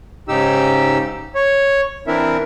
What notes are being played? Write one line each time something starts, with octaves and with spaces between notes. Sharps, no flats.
G#2 C#3 D#4 G4 E6
C#5
E3 C4 D4 E4 A#4 E5